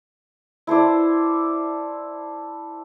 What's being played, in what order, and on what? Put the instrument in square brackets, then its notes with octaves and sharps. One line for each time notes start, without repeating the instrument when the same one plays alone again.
[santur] E4 A4 C5 D5